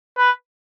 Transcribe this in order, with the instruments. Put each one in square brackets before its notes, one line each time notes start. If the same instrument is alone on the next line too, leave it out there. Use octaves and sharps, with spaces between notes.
[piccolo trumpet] B4